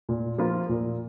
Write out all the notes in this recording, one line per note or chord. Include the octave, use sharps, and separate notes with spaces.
A#2
F3 A#3 F4
A#2